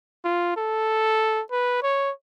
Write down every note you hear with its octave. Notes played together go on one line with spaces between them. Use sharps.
F4
A4
B4
C#5